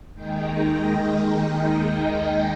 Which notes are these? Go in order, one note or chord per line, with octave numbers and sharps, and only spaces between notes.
D#2 D#3 G#3 D#4 G5
D#5
D#5